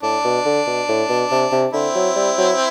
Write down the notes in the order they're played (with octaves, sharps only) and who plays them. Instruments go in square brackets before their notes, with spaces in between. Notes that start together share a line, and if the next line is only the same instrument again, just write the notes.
[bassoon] A2 [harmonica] D4
[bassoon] B2
D3
B2
A2
B2
C3
C3
[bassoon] D3 [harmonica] C4 E4
[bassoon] F#3
G3
F#3